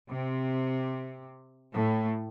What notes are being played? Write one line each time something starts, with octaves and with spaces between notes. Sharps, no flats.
C3
A2